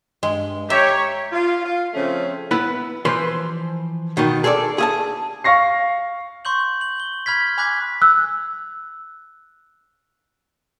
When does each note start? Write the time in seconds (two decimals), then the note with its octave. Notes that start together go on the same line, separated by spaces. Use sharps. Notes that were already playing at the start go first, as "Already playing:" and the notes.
0.23 G2 G#3
0.70 G4 C#5 E5 A#5
1.32 F4
1.65 F4
1.94 C#3 F3 A3 C4 C#4
2.51 B3 E4 B4
3.05 E3 F3 B4 C5 C6
4.17 B2 D#3 D#4
4.44 G#4 A4 C#5 D5
4.78 G#4 E5 A5
5.44 F5 C#6 A#6 C7
6.45 C6 C#6 G6 F#7
6.81 F#7
7.00 G7
7.26 B5 F6 G#6 B6
7.58 G#5 B5 D6 F#6 G#6 B6
8.02 E6 F#6